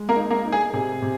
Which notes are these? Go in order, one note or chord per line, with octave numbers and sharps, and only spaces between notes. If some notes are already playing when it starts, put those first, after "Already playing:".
Already playing: G#3
A#3 A#4
D#4
A#3 A#4
D#4
G#4
C3 G#4
C3